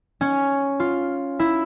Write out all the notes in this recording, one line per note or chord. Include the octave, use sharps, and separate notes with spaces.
C#4
F4
E4